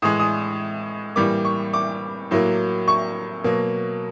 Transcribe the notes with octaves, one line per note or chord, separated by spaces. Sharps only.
A2 E3 G#3 D#6
D#6
A2 E3 G3 A#3 D6
C#6
D6
A2 F#3 A#3
C#6
B2 F#3 A#3